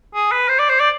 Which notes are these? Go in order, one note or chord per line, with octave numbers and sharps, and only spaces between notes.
G#4
B4
C5
D5
C5
D5